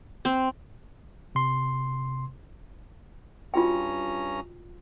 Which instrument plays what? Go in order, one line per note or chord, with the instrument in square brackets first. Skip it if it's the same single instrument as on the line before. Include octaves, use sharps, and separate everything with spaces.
[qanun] C4
[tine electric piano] C3 C6
[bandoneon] G2 C#4 A#5 [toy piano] F4 F#4 G5